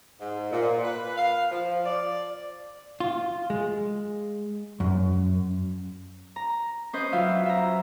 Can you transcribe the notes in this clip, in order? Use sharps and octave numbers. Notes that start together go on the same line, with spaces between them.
G#2
A#2
B4
F5
F3
D5
F4
G#3
F#2
A#5
C#4 B4 C5 D#5
F#3 F4 E5 F5
E5 A#5